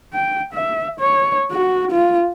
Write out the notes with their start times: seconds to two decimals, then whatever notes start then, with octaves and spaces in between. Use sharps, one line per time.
0.13 G5
0.53 E5
1.00 C#5
1.51 F#4
1.91 F4